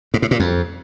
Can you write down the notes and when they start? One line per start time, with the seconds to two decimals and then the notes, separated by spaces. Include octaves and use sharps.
0.14 G#2
0.22 A2
0.31 A#2
0.40 F2